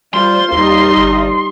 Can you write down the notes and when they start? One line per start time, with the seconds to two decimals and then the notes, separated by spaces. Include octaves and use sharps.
0.14 G3 F4 C5 C6
0.52 D#2 G3 D#4
0.97 G1